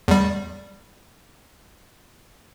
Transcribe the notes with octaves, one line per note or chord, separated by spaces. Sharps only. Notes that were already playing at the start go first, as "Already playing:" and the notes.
E2 G3